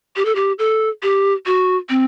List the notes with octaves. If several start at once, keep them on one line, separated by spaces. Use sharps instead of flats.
G4
A4
G4
A4
G4
F#4
C4